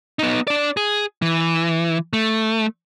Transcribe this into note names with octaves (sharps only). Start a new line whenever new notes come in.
B3 D#4
D4 D5
G#4
E3
A3